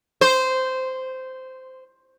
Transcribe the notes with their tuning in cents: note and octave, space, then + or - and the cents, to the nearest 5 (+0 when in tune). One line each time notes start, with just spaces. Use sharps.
C5 -10